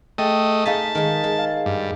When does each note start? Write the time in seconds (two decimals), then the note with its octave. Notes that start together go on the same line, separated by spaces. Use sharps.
0.18 A3 G#4 D#5 G5
0.65 A3 D#4 G#4 F5 A5 B6
0.95 D#3 G#3
1.24 G#3
1.38 F5
1.66 G2